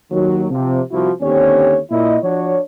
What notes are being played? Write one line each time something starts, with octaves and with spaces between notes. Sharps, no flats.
D#2 D#3 F#3
C3 F3
C2 F3 E4 F#4
D#2 D3 C4 C#4 G4 C#5
A#2 E4 D#5
F3 D4 F#4 C#5